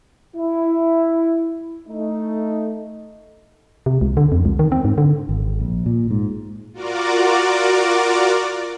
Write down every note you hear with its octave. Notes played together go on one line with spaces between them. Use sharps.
E4
A3 D#4
C3
C#2
D3
F2
C#2
D#3
C4
G#2
D3
G#1
A#1
A#2
G#2
F4 F#4 A#4 D5 D6